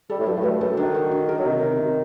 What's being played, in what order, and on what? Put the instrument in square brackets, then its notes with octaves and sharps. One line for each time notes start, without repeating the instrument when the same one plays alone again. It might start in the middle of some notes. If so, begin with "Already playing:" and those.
[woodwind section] G3 [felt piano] A4
[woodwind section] A2
[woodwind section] G2 [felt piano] F#3
[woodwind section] A2
[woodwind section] G2 [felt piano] A3
[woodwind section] F#2 [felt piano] A4
[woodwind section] D#3 [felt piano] D4
[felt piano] F#4
D4
A#4
[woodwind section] F#3
[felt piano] C3 [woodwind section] D#3
[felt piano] C3
C3